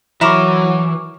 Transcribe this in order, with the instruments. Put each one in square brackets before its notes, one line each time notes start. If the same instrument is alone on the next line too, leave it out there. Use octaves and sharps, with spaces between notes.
[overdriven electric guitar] E3 [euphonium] F#3 [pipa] E4 A#4 [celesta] C#6 D6 E7